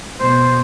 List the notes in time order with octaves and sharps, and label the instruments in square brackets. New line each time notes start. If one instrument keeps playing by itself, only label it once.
[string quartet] B2 [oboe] C5